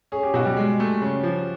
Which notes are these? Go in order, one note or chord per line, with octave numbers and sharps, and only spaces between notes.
C#4 G#4
G4
B2 F#4
G3 G4
G#3
A3
C#3
F3